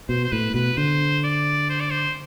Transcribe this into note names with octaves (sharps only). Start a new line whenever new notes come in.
B2 C5
C5
A2 B4
B2 B4
D3 C5
D5
C5
D5
C5